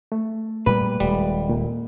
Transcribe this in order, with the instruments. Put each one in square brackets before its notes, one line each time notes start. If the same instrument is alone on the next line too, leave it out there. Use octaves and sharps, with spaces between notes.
[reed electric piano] A3
[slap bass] A#2 G3 A#3 [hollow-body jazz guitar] B4
[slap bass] D#1 G#3 [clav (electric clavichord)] G3
[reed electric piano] A#2